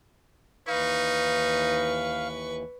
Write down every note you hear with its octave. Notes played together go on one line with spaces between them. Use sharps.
D#2 E3 D#4 B4 F5 C#6